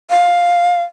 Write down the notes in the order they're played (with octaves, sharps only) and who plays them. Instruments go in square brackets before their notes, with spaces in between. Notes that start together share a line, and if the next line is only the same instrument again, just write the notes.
[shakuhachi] F5